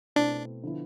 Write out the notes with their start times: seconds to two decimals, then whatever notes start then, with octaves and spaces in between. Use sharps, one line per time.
0.16 B2 A3 C4 D4 E4
0.63 D3 F3 B3 E4